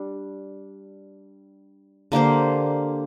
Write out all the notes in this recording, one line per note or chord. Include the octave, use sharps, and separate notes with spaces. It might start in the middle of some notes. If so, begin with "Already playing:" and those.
Already playing: G3 D4
D3 A#3 G4 C5